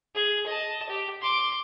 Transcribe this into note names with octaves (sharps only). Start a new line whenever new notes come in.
G#4
D#5 A5
G4
C6 D6